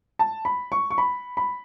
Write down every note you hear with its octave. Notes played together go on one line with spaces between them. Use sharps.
A5
B5
C#6
C#6
B5
B5